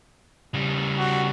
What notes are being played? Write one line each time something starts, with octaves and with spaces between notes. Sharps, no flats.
C#3 G3
F#4